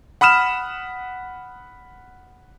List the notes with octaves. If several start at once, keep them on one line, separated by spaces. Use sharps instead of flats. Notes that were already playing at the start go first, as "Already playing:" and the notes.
F#5 B5 D#6 F6 E7